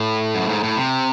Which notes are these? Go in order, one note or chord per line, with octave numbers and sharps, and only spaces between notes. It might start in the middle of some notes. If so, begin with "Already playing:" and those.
Already playing: A2
F#2
G#2
A2
C3